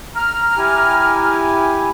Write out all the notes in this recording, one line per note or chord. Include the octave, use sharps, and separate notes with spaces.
A#5 F6
E4 G4 G#5